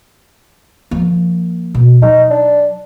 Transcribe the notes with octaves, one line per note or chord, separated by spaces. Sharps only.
F3 A#3
B2
F#3 D#4
D4